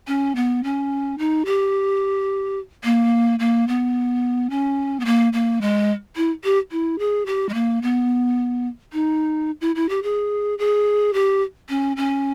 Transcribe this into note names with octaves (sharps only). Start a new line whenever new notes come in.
C#4
B3
C#4
D#4
G4
A#3
A#3
B3
C#4
B3
A#3
A#3
G#3
E4
G4
E4
G#4
G4
G#3
A#3
B3
D#4
E4
E4
G4
G#4
G#4
G4
C#4
C#4